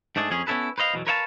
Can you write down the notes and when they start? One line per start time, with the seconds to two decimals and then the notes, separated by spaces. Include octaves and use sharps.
0.16 G#2 A3 D4 G#4
0.31 F2 C#4 G#4
0.47 B3 C#4 E4 A4 B4
0.78 B4 C5 D#5 F5
0.94 E2 B2 F#3
1.07 A#4 B4 C#5 F5 F#5 A5